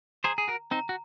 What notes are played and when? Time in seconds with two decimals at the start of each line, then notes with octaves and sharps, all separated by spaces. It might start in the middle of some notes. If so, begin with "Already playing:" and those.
0.24 G#4 C5 A#5
0.38 G#4
0.48 F#4 A#4
0.71 C4 D#4 A#5
0.89 F#4